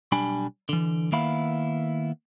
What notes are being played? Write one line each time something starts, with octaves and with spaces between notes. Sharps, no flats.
B1 G3 D4 G#5 B5
D3 E3
D#3 A#3 B3 E4 F5 B5